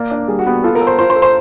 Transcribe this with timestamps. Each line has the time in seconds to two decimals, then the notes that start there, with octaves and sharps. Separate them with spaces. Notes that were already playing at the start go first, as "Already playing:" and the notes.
Already playing: A#3 D5
0.11 D4
0.28 G3 G#4
0.39 F#4
0.46 B3 G4
0.64 F4 A4
0.75 A#4
0.81 A4
0.87 C5
0.99 F4 C5
1.10 C5
1.16 A4
1.22 C5